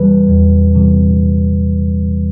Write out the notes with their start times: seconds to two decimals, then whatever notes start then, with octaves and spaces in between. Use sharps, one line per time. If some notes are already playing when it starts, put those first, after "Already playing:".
Already playing: E2 C3 E3 G3 B4
0.28 E2
0.75 C3 E3 G3